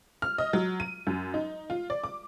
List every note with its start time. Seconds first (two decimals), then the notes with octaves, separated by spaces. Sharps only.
0.22 F6
0.38 D#5
0.53 F#3
0.80 D#7
1.07 F#2
1.34 D#4
1.70 F4
1.90 D5
2.04 D6